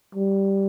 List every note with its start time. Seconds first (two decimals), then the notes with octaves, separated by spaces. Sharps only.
0.15 G3